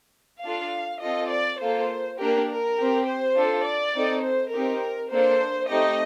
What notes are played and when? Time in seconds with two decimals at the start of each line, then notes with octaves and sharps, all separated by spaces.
0.44 D4 F4 A4 F5
1.03 C4 F4 A4 D#5
1.32 D5
1.61 A#3 F4 A4 C5
2.19 A#3 D4 G4 A#4
2.49 A#4
2.78 C4 G4
3.08 C5
3.37 D4 F4 A4
3.66 D5
3.95 C4 D#4 A4
4.24 C5
4.53 C4 D#4 G4 A#4
5.12 A#3 D4 A4 C5
5.70 A3 C4 D#4 G4 D#5